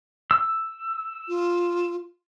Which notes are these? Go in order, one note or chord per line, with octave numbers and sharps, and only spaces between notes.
E6
F4